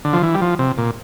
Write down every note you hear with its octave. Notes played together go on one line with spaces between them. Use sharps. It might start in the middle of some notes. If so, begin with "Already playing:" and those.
D3
F3
E3
G3
F3
C3
A#2